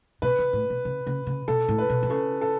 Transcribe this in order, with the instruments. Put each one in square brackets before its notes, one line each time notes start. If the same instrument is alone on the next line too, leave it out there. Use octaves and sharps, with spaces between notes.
[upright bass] B2 [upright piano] B4
[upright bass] C#3
A2
B2
C#3
C#3
C#3
[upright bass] B2 [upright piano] A4
[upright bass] A2
[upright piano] B4
[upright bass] B2
E3
[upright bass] C#3 [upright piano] A4
[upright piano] A4